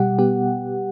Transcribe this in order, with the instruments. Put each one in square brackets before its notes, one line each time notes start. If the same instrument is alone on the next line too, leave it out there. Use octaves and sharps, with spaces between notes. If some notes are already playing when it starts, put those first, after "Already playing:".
Already playing: [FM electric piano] B2 G3 G4 F#5
B3 G4